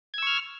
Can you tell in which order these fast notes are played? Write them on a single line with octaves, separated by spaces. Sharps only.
G#6 E6 C#6 F6